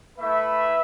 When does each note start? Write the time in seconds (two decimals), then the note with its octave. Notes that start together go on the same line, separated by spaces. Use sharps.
0.18 A3 E4 B4 E5